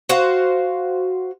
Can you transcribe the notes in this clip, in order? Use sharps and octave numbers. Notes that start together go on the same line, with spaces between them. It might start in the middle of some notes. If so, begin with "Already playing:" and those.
F#4 C5 F5